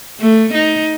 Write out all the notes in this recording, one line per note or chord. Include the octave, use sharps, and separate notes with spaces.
A3
D#4